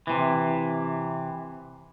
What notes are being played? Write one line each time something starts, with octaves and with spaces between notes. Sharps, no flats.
C3 E3